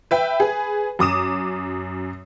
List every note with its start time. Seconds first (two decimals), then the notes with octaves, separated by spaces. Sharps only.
0.11 B4 E5 G5
0.40 G#4 B4
0.99 F#2 D6 D#6 E7